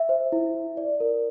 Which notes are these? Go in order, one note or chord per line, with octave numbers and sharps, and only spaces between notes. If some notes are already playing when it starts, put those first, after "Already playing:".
Already playing: E5
C5
E4
E4
D5
A#4